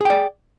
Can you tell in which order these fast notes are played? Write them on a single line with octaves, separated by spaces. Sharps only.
G#4 G5 D5